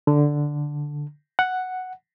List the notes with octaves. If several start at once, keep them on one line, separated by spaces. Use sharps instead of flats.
D3
F#5